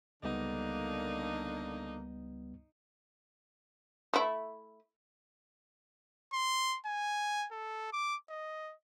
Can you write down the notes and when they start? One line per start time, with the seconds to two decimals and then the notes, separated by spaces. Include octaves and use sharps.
0.23 C#2 D3 G3 A#3 B3 D4 D#4
4.14 A3 E4
6.33 C6
6.86 G#5
7.51 A4
7.92 D6
8.29 D#5